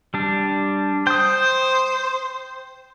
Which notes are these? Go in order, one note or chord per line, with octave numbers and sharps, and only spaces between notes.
G3 D4
C5 G5 D#6